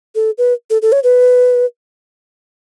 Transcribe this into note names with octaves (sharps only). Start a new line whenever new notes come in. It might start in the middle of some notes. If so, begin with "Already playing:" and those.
A4
B4
A4
A4
C#5
B4